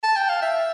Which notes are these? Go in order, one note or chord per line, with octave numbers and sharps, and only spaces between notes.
A5
G5
F5
E5